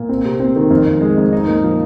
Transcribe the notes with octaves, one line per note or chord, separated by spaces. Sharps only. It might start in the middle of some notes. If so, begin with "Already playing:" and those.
Already playing: A#2
C4
C3
C4
D#3
F2
F2
G#3
F2
D#4
A#2
F3